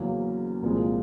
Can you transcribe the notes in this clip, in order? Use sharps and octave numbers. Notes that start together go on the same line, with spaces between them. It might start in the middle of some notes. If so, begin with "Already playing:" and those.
Already playing: E2 C#3 F#3 A#3 C#4
C2 A#2 F3 G#3